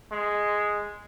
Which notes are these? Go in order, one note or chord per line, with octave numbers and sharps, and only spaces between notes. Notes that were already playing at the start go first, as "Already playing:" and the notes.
G#3